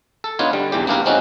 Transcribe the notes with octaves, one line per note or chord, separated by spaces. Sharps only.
A4
B3 D4 D#4 F4 C#5
D3 G3
B1 E2 E3 G4
A#3 B3 D4 E4 G4 A#4
G#3 C4 C#4 D#4 F4 F#4